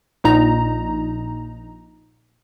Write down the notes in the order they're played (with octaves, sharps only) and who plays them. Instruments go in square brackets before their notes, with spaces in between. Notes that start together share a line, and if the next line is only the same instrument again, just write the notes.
[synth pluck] A#1 A#2 D#4 A#5